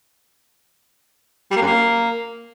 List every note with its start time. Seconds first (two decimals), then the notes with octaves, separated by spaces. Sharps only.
1.51 G3
1.56 A#3
1.61 F#2
1.66 A#3